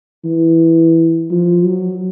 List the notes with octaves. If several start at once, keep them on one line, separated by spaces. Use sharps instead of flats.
E3
F3
F#3